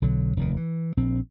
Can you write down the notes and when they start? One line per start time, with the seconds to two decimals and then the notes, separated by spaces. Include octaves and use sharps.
0.02 B1 D3 F#3
0.37 F1 D#2 A#2 D#3
0.57 E3
0.97 A#1 C4